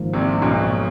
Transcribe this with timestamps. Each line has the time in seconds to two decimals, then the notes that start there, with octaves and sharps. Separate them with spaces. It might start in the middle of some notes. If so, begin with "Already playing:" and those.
Already playing: G#1 G#2 F3 A#3
0.13 C2 C3
0.42 B1 B2